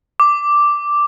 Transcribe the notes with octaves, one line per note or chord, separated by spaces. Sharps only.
D6